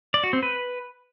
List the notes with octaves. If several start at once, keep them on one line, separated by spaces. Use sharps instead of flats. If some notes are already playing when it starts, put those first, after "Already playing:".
D5
F#4
C4
B4